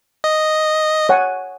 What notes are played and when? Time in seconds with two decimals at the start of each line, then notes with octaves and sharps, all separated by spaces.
0.24 D#5
1.09 C#5 F#5 G#5